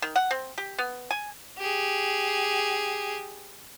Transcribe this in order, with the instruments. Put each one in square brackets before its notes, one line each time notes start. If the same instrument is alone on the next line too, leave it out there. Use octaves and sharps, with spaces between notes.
[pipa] D#3
F#5
C4
G4
B3
G#5
[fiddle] G4 G#4